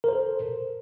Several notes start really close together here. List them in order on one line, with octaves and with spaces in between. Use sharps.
A#4 C5 A4